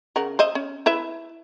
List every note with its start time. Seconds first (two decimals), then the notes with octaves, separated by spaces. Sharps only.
0.16 C#3 A#4 F#5
0.39 C5 D#5 E5
0.55 C#4
0.86 E4 B4 E5